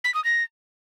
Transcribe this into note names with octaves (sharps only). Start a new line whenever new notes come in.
B6
D#6
A#6